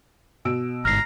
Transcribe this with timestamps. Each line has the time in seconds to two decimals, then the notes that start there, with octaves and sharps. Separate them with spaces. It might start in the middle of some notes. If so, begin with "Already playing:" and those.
0.45 B2 E6 D7
0.85 G1 G#2 A#5 F6 C7